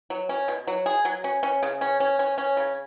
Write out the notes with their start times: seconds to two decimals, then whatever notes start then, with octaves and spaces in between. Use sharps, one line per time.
0.10 F#3
0.29 C#4
0.48 B2
0.67 F#3
0.86 G#4
1.05 F#3
1.24 C#4
1.43 C#4
1.63 C#3
1.81 C#4
2.00 C#4
2.19 C#4
2.38 C#4
2.57 C#3